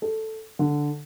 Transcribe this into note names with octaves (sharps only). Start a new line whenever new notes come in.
A4
D3